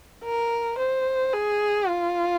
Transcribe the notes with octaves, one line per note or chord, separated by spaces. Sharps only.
A#4
C5
G#4
F4